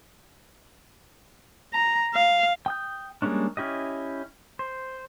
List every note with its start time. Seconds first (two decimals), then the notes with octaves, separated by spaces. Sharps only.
1.74 A#5
2.15 F5
2.66 G5 D#6 G6
3.22 G3 G#3 A#3 C#4 D4
3.57 C#4 E4 G4 D#5
4.59 C5